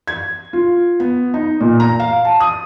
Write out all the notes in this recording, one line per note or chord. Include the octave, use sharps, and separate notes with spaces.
G#6
F4
B3
D#4
A#2
A#5
F5
A5
D#6